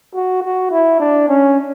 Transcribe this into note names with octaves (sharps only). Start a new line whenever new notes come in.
F#4
F#4
E4
D4
C#4